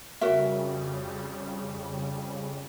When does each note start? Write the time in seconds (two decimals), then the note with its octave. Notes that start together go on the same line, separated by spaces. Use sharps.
0.21 F2 C#3 G3 F#4 A#4 E5